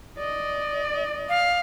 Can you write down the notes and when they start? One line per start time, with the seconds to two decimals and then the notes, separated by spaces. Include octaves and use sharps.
0.18 D5 D#5
1.28 F5